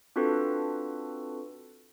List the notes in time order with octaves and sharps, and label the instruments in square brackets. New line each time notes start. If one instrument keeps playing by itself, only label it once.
[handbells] C4 D4 F4 F#4 A4 B4